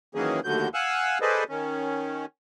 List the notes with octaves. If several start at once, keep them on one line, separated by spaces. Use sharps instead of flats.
D#3 E3 F#3 A#3 C#4 G#4
D#2 A2 D3 F#3 G6
F5 F#5 G#5 E6 F#6
G#4 A4 B4 C5 D5 D#5
D#3 C#4